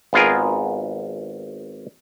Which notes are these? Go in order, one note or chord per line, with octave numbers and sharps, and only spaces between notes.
G#1 B3 F4 G#4 A#4